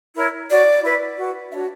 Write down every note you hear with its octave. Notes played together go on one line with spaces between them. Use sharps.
E4 A#4 C#5
F#4 C#5 D5
E4 B4
F#4 B4
D4 F#4 C#5 E5